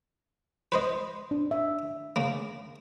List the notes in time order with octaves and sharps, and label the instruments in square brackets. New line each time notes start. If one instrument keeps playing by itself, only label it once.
[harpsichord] B4 C5 D#5
[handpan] D4
E5
[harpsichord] C#3 A#3